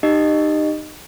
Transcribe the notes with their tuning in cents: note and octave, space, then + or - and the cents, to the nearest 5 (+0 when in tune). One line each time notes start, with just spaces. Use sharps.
D#4 -25 G4 +0 D#5 -15